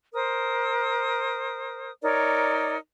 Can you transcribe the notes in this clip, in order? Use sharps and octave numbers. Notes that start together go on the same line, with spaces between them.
A#4 C5 D#6
D#4 A#4 C#5 D5